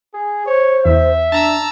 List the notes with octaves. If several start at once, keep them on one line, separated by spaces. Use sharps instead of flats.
G#4
C5 C#5
E2 E5
D4 A5 A#5 E6